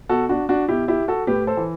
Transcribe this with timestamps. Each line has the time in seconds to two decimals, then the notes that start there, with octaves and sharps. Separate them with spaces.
0.09 B2 F#4 A4
0.29 D4 F#4
0.49 D4 F#4
0.68 B2 E4 G4
0.88 E4 G4
1.08 F#4 A4
1.27 A2 G4 B4
1.47 A4 C5
1.57 E3